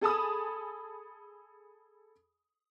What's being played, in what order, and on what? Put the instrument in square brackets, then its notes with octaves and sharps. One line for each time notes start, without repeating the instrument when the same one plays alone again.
[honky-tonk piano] G#4 A4 G#5 A5 B5 D#6